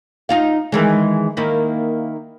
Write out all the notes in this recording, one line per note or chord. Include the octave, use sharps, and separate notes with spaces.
D#4 F4 F5
D#3 E3 G#3
D#3 A#3 E4